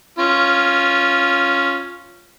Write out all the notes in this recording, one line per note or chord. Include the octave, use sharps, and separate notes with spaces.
C#4 F4